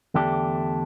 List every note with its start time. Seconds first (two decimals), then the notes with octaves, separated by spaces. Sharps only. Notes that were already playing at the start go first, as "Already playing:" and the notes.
0.14 E2 D3 A3 D4 G4